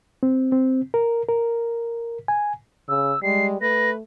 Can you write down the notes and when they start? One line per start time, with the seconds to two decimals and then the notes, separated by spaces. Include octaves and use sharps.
0.23 C4
0.52 C4
0.94 A#4
1.29 A#4
2.28 G#5
2.89 C#3 E6
3.23 G3 G#3 C7
3.61 A3 B4 A#6